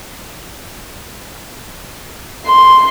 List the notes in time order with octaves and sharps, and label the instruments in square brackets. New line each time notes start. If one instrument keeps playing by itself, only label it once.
[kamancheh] C6